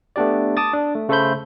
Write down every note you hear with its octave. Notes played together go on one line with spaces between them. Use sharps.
A3 B3 D4 G4 D5
A5 D6 D#6 A6
D4
A3
C#3 A3 A4 C5 B5 G6